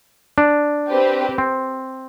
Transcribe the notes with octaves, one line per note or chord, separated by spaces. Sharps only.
D4
C4 G4 B4
C4